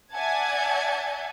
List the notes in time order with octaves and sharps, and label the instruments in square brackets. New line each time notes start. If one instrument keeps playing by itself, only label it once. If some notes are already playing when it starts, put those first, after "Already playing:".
[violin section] D5 E5 F#5 G#5 A5 G#6